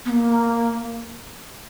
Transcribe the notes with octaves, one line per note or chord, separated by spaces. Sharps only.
B3
A#3